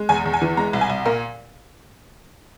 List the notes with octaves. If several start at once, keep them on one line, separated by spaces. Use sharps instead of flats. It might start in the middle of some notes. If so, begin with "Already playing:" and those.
Already playing: G#3
E2 G#5
E2
G#5
E3
G#3 A#5
C2
G#5
C2
A#2 A#4